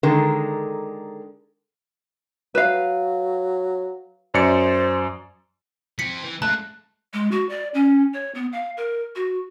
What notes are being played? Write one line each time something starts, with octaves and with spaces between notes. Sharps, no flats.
D3 D#3 G#3 A4 A#4
F#3 B4 F5
F#2 C5 D5 C#7
F3 C4 B6 C#7
E3
G#3 A3 A5 F#6
G#3
F#4
D5
C#4
C#5
B3
F5
A#4
F#4